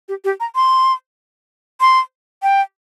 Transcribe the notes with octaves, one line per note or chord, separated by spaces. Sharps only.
G4
G4
A#5
C6
C6
G5